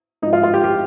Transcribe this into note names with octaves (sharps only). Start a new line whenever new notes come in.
G#2 F3 D#4
F4
F4
G4
G4